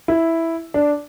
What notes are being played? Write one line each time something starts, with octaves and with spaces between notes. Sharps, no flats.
E4
D4